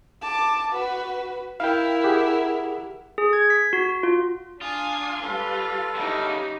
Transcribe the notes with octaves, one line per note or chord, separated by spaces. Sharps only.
A5 D6
F#4 B4
E4 A#4 F5 G5
G4 G#4 F#5
G#4
G#6
B6
F#4
F4
D4 F4 G#5 D#6
G3 A4 B4 F5
F#2 C#3 D#4 G4